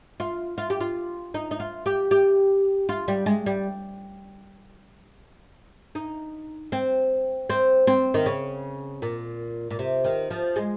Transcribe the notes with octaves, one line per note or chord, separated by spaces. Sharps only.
F4
F4
G4
F4
D#4
D#4
F4
G4
G4
F4
G3
G#3
G3
D#4
C4
C4
C4
D#3
C#3
A#2
A#2
C3
D#3
F3
G#3